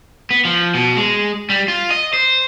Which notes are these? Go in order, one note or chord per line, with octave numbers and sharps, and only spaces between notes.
B3
F3
B2
G#3
G3
F4
D#5
C5